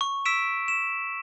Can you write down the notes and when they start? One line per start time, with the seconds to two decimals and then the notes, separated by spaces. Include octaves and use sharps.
0.01 C#6
0.25 E6 B6 D7 E7
0.68 E7